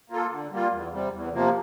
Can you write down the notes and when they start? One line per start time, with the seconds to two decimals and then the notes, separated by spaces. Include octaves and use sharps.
0.10 A#3 F4 A4
0.31 D3
0.52 G3 A#3 F4
0.72 E2
0.92 C3 G3
1.13 E2
1.33 C3 F3 A#3